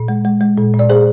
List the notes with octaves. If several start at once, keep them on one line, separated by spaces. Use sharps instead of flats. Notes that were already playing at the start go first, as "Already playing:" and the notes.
Already playing: A#2
G#3
G#3
G#3
A#2
A#2
D5
A#2 G#4 C5